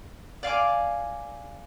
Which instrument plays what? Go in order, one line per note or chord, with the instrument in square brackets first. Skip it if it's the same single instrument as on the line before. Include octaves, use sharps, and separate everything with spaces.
[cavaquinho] D5 F5 G#5 D6